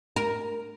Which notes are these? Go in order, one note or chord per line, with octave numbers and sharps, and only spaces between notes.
A#4